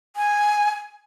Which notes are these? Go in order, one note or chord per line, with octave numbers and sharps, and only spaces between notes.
G#5